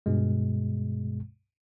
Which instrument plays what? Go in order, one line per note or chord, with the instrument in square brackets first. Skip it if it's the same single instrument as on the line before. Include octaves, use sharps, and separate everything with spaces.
[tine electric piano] G2 B2 G#3